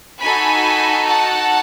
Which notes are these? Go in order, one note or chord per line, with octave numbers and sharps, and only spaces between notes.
D#4 F#4 A4 G#5 B5
F#5 A5